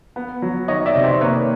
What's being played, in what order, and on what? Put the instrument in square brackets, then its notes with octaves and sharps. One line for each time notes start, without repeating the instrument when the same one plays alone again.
[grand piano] B3
F#3
D#3 C#5 D#5
D5 E5
C3
C5 D5
A#3 B4 C#5